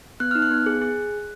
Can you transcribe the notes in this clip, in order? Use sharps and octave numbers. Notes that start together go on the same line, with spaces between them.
B3 F#6
D#4 F6
F#6
B3
G#4
G#4